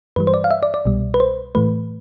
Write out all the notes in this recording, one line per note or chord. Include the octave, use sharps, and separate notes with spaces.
G2 E3 G3 B4
C5
D5
F5
E5
D5
D5
C2 B2 G3
B4
C5
A2 E3 A3 B4